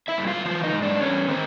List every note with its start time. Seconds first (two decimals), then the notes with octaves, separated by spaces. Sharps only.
0.08 E4 E5
0.18 G2
0.27 F4 F5
0.45 E3 F4 F5
0.64 D#4 D#5
0.72 G#2
0.82 D4 D5
1.00 E2 C#4 C#5
1.28 D#3 C4 C5